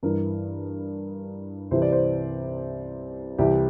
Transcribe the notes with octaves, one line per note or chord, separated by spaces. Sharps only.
G2 E3 A#4
C2 C3 E3 C5
D5
C5
C2 C3 E3 G4